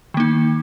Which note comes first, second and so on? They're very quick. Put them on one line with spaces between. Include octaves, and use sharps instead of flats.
D#3 A#3 D#4